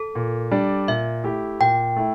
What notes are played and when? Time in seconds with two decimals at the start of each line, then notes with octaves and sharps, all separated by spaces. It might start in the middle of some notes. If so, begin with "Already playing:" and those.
Already playing: A4
0.15 A#2
0.51 G3 D4
0.88 A#2 E5
1.24 A3 E4 G4
1.60 A#2 G5
1.97 A3 E4